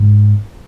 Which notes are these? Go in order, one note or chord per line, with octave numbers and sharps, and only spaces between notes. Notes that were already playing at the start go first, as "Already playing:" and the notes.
Already playing: G#2